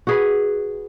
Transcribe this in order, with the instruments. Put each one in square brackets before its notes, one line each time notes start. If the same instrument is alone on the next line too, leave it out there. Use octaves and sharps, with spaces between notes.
[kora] F#4 G#4 B4